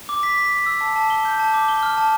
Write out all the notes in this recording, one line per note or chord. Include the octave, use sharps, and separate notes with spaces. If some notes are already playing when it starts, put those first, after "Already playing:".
D6
B6
B6
B6
E6
A5
A5
G7
G6
A5
D6
G7
F6
A5